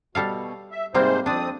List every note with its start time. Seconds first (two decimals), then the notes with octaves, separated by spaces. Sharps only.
0.15 B2 G3 A4 F5
0.72 E5
0.94 G#2 C3 G3 A#3 C4 C5
1.26 F2 C4 D4 D5 D#6